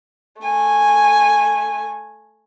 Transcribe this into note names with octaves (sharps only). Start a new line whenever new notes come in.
A3 G#5